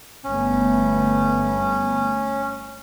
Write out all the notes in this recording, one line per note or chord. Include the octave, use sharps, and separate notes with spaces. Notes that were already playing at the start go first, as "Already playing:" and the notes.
G1 A3 B3 C#4